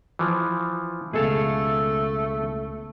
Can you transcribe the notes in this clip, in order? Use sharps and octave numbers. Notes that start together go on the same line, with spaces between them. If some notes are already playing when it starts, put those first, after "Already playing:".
E3 F3
C#2 B2 A3 G#4 A4 F5